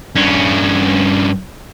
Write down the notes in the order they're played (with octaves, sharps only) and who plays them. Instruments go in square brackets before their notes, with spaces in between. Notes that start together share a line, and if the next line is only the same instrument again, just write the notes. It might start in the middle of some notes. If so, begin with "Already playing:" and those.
[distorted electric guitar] G2 C#4